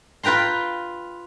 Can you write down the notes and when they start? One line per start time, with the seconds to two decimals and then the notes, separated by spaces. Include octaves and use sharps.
0.23 F4 B4 G5 A#5 C6